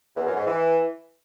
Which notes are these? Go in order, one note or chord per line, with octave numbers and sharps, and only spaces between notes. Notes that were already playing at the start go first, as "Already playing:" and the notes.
E2
F#2
G#2
E3